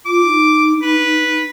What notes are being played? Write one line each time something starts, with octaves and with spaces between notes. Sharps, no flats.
F4 D6
D#4
B4